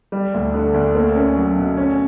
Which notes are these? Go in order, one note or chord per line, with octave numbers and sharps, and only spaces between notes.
G3
D2
D3
D2
A#3
C#4
F#3
B2
C#4